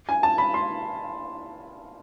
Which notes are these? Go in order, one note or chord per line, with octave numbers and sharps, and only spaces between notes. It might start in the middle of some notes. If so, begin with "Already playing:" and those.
G#5
A5
B5
C6